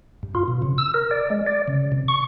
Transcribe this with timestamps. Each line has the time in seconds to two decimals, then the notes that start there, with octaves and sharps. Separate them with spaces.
0.23 G2
0.35 F4
0.48 B2
0.62 C#3
0.78 E6
0.94 A#4
1.11 D5
1.30 G#3
1.46 D5
1.68 C#3
1.92 C3
2.08 C#6